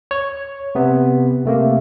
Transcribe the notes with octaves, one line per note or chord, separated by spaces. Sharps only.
C#5
C3 B3
C3 A3 A#3